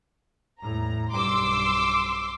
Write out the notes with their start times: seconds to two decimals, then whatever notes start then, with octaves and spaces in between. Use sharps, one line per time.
0.61 E2 A2 A#5
1.12 B1 G2 C6 D6 E6